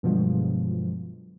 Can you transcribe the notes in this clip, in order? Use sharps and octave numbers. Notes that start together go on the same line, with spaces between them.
G2 B2 D3 F3 F#3 G#3